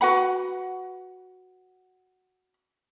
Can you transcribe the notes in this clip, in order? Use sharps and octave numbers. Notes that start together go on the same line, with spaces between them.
F#4 B4 F#5 B5